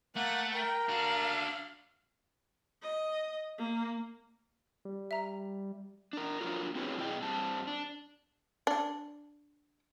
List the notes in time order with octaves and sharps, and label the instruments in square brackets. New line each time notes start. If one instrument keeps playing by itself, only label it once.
[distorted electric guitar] A3 [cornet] A#3 [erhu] F#5
[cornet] A#4 [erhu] G5
[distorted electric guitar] D4 F#4 [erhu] F5
[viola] D#5
A#3
[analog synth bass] G3
[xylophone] E5 A#5
[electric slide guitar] D4 A#4
F3 F#3 D4 F4 A4 A#4
C4 E4 F#4 G#4 B4 C#5
F#2 B2 E4 G#4 D#5 G5
G2 G3 C4 A5
D4
[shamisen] D4